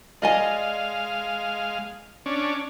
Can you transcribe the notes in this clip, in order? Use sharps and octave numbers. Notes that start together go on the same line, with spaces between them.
G#3 D5 D#5 F5 G#5
C#4 D4